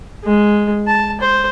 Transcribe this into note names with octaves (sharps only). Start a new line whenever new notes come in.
G#3
A5
C5